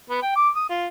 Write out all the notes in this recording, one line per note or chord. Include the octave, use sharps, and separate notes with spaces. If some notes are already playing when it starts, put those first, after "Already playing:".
B3
G5
D6
D#6
F4